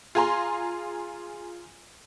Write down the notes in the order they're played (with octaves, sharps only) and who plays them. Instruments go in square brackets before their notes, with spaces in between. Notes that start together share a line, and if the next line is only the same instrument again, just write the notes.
[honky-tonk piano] F4 G#4 G#5 A#5 C6